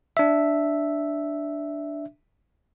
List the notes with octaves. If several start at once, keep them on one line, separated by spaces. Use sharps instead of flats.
D4 E5